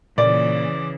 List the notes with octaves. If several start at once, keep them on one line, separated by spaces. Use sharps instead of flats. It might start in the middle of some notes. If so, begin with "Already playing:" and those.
A#2 C#3 E3 D5